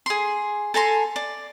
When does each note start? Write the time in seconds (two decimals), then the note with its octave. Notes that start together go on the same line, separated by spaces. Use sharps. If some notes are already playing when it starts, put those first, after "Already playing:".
0.06 G#4 C6
0.74 A4 G#5 A#5 C6
1.16 D5